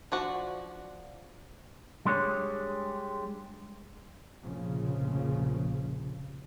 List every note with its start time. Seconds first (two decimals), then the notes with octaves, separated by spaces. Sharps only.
0.12 F3 D4 F#4
2.06 G3 G#3 D4 C#5
4.42 F1 A#1 C#3 F3